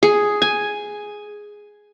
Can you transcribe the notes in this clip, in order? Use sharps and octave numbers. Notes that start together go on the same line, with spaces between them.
G#4
G#5